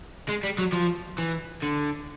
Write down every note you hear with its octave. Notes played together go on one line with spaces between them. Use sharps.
G#3
G3
F#3
F3
E3
D3